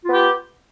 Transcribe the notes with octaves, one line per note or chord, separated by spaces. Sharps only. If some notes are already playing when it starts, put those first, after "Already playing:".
B3 F4 G4